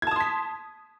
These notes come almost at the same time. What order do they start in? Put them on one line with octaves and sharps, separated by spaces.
G#6 A5 D#6 C6 B6